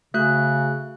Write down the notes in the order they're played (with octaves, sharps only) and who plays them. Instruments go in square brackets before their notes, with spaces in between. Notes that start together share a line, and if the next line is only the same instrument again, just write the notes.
[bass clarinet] C#3 [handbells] A3 F#4 F#6